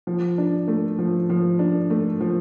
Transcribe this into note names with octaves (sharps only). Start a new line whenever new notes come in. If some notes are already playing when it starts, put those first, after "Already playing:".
F3
D4
A3
F3
F3
D4
A3
F3